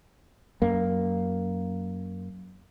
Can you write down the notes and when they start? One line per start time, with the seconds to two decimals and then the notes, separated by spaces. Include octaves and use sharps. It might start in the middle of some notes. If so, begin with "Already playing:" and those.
0.62 F#2 A#3